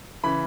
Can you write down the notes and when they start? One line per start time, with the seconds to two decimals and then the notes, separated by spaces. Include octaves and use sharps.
0.24 C#3 E3 B5